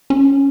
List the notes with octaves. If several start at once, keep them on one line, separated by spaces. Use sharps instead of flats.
C#4